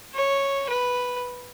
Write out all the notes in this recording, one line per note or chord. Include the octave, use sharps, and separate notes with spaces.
C#5
B4